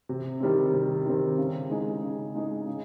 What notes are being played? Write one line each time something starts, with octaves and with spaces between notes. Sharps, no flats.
C3
D#3 G3 C4
C3
D#3 G3 C4
C#3
G#3 D#4 G#4
C#3
G#3 D#4 G#4
C#3